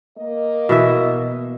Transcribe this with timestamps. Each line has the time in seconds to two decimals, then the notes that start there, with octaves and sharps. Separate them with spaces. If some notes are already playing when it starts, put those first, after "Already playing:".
0.17 A#3 D#5
0.69 B2 E3 E5